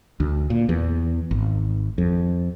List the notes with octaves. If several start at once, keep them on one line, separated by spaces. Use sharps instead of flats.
D2
A#2
E2
G#1
F2